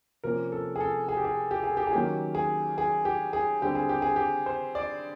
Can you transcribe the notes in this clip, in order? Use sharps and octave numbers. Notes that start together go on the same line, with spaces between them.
C3 F3 A#3 C#4 A#4
A4
G#4
A4
G#4
G4
G#4
G4
G#4
G4
G#4
D#3 F#3 A#3 C#4 G4
G#4
G#4
G4
G#4
D3 G3 C4 G4
G#4
G4
G#4
G4
C5
D5